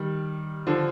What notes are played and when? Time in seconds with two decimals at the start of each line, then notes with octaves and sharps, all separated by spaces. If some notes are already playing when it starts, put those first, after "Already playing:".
Already playing: D#3 G3
0.67 D3 F3